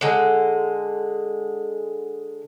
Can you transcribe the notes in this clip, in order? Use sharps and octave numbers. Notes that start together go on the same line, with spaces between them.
D3 G#3